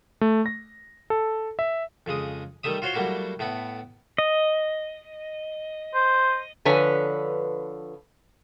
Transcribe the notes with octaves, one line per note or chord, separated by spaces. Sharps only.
A3
A#6
A4
E5
F2 C#3 G#3 D#6
D#3 G3 A3 E5 D#6
F4 F#4 C5 C#5 F5 C6
F#3 G3 A3 A#3 E4 F#4
A2 A3 B3 B5
D#5
C5
D3 F3 B4 C#5 G#5